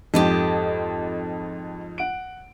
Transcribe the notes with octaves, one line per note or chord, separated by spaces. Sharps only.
F2 G#2 G4 A4 D#5
F#5 D7